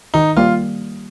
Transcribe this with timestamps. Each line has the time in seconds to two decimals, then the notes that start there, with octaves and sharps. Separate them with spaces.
0.14 D#3 D#4
0.37 G3 A#3 F4